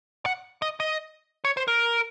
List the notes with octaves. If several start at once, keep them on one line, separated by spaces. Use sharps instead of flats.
F#5
D#5
D#5
C#5
C5
A#4